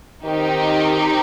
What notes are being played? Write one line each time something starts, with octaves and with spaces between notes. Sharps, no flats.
D#3 C4 D#4 G4